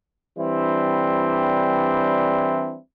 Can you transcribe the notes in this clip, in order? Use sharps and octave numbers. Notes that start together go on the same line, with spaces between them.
E3 G3 C4 D4 E4